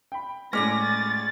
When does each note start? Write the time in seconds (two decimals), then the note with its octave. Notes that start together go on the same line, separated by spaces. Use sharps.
0.12 G5 B5
0.53 A2 G#3 C#4 D5 G#5 A#6
0.83 A6